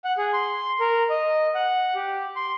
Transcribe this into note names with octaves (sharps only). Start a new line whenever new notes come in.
F#5
G#4
C6
A#4
D#5
F#5
G4
C6